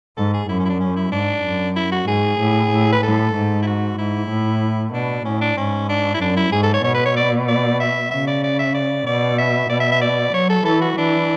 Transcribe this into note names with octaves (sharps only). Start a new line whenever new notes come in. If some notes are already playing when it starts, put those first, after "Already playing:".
G#2 A4
G#4
F#2 E4
C#4
E4
D4
C#4
E4
G#2 D4
F#2
E4
F#4
G#2 G#4
A2
A2
B4
A2 A4
G#2
E4
F#4
G#2 E4
A2
B2 D4
A2 C#4
D4
G#2 C#4
D4
E4
F#2 D4
E4
G#2 G#4
A4
C#5
B2 C#5
B4
C#5
D5
D5
E5
C#3 E5
D5
D5
E5
D5
B2 D5
E5
B2 D5
E5
E5
D5
F#3 C#5
A4
E3 A4
F#4
E3 D4